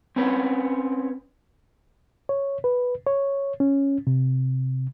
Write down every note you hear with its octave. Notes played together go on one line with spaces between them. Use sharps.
C4 C#4 B4
C#5
B4
C#5
C#4
C3